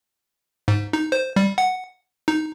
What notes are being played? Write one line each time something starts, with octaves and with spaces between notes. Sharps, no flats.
G#2
D#4
C5
G3
F#5
D#4